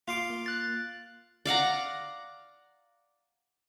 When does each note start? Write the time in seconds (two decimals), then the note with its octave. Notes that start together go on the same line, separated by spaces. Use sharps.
0.08 A#3 F4 C6 D6
0.30 A#3
0.46 F#6 A6
1.45 D5 F5 F#5 A#5